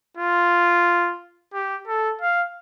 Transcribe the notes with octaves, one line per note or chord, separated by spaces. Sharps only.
F4
G4
A4
F5